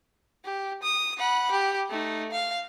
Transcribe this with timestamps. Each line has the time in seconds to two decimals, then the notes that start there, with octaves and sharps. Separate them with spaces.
0.45 G4
0.83 D#6
1.17 F#5 B5
1.51 G4
1.90 A3 D#4
2.32 F5